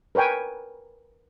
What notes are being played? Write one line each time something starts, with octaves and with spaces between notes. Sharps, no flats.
A#4 B4 C#5 G5 G#5